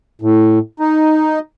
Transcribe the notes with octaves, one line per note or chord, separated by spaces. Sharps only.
A2
D#4